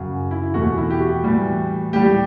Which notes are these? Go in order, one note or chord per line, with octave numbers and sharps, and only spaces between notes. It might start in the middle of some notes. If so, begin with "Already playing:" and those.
Already playing: F#2 C#3 F#3
E4
E2 B2 A3 F#4
E4
G4
F#4
A2 E3 G3
A2 G3 G4